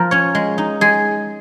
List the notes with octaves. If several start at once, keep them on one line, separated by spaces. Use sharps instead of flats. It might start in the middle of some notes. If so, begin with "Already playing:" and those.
Already playing: F3 A#4
C#4 C#5
G#3
D#4
G#3 G#4